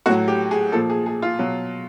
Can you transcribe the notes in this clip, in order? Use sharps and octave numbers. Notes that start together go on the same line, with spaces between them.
A2 F#3 F#4
G4
G#4
A#2 F3 A4
G#4
G#4
F4
B2 F#3